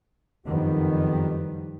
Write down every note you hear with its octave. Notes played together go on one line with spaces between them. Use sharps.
F#1 F2 D#3 G3 B3